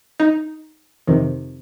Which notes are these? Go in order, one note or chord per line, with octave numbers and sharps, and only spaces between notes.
D#4
F2 C3 D#3